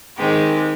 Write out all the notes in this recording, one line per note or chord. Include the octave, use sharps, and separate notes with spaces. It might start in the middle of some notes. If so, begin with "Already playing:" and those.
D#3 G#3 C4 G4